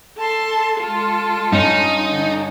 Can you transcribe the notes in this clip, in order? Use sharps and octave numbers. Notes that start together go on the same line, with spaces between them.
A4 A5 C6
G#3 F4 A4
G2 C#4 D#4
D3